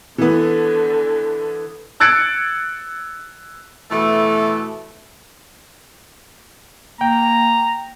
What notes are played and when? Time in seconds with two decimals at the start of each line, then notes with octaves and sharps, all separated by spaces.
0.18 D3 E3 B3
2.00 E6 F#6 G#6 A6 C#7 D7
3.91 B2 E3 A3
7.01 A#3 G5 A#5